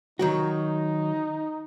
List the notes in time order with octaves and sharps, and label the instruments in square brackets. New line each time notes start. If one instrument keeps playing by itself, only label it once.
[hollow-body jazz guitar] D#3 F#3 F#4 [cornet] D#4